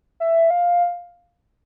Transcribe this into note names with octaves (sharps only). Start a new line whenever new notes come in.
E5
F5